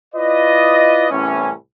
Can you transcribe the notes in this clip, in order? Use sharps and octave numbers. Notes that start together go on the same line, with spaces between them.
E4 F4 B4 D5 D#5
C2 A2 E3 B3 C#4